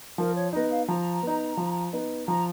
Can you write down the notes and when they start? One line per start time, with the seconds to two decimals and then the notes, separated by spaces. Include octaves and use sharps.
0.18 F3 A#4
0.35 C#5
0.53 B3 D#4 D#5
0.70 F5
0.88 F3 A#5
1.23 B3 D#4
1.57 F3
1.93 B3 D#4
2.27 F3 A#5